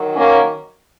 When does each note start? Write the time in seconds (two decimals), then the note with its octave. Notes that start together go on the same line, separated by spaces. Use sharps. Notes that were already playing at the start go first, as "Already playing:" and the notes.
Already playing: D#3 F#3
0.16 A#3 C#4